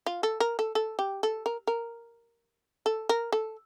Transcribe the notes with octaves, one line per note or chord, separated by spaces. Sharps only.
F4
A4
A#4
A4
A4
G4
A4
A#4
A#4
A4
A#4
A4